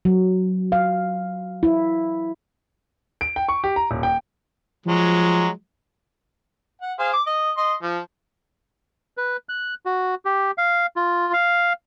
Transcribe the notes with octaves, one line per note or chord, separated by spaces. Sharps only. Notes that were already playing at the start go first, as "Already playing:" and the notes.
F#3
F5
E4
D7
G5
C#6
G4
A#5
D#1
G5
F3 F#3 G#3
F#5
G#4 C5 F5
D6
D#5
D#5 C6
F3
B4
F#6
F#4
G4
F5
F4
F5